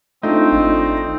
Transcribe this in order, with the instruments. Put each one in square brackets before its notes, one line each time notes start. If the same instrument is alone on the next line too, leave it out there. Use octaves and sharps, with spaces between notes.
[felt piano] A3 D4 F4 [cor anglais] C4 [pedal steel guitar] D#4
[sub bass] G#1